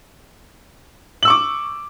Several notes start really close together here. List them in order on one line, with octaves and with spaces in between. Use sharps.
F#7 E6 C#6 D6